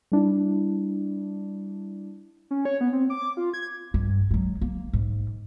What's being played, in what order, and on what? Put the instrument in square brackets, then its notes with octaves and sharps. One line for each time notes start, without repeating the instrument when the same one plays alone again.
[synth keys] G3 D4 E4
[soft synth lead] C#4
C#5
B3
C4
D6
F4
G#6
[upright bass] G2
F#3 G#3
A#3
G#2